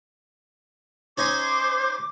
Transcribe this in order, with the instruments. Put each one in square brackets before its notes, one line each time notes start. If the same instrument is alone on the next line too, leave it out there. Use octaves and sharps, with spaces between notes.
[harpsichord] C#4 D#4 G#5 [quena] C5 [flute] D6